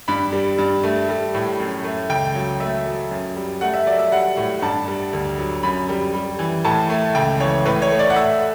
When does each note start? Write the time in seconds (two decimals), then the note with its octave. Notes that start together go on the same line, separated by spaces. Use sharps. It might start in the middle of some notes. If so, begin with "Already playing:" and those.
0.08 G2 B5
0.33 G3
0.58 G2
0.83 A3
1.09 G3
1.34 A2
1.59 F#2
1.84 A3
2.09 C#2 G5
2.35 F#3
2.60 A3 E5
2.86 F#3
3.11 F#2
3.36 G3
3.61 A3 F#5
3.74 E5
3.86 F#3 D5
3.99 E5
4.12 G3 F#5
4.37 A2
4.62 G2 A5
4.88 G3
5.13 D2
5.39 F#3
5.63 F#2 B5
5.89 G3
6.14 G3
6.39 E3
6.64 A2 A5
6.90 A3
7.15 C#2 G5
7.40 E3 C#5
7.66 A2 B4
7.82 C#5
7.91 A3
7.99 D5
8.10 F#5
8.16 A3 E5